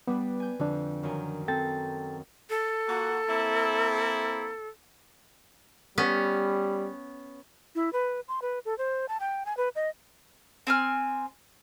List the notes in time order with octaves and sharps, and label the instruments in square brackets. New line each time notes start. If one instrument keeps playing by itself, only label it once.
[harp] G3 D4 B4 [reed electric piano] B3
[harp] G#5 G6
[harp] F2 [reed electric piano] D3 F3 D4
[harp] F#2 D#3 G#5
[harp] C4 [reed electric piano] A4 G5 A6
[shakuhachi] A4
[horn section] A#3 F4 F#4
A#3 C4 E4
[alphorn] G3 [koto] B3 C#4
[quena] E4
B4
C6
B4
A4
C5
A5
G5
G#5
B4
D#5
[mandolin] C4 G#5 F6